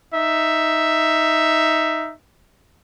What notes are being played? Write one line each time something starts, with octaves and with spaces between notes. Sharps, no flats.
D#4 E5